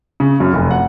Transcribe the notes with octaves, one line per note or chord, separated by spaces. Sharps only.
C#3
F#2
F1
F#5